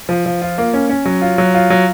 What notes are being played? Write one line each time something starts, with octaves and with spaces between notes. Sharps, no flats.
F3
F3
F4
A#3
C#4
C#4
F#3
F4
F#3
F4
F#3